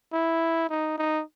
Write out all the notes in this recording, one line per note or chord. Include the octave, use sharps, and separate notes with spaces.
E4
D#4
D#4